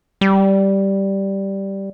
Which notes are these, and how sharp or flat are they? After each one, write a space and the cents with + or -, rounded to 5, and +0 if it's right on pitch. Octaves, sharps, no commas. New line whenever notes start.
G3 -5